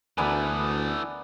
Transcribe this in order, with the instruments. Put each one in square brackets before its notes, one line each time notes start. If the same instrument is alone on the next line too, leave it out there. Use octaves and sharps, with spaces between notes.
[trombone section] D2 [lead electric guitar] E3 A3 [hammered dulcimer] B3 D4 A#4 [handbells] G#5 B5